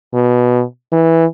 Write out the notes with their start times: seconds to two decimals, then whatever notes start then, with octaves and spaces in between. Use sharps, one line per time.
0.14 B2
0.92 E3